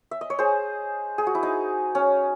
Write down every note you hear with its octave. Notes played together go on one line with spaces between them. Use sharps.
E5
D#5
C#5
G#4 C5
G#4
F#4
E4
D#4
C#4